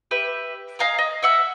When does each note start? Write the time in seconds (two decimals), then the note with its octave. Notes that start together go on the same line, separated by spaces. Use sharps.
0.11 G4 B4 E5
0.79 D#5 F5 G#5 A#5
0.99 D#5
1.23 E5 F#5 E6